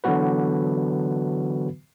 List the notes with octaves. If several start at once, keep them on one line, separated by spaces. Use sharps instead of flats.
D3 E3 F#3 B3 F#4 B4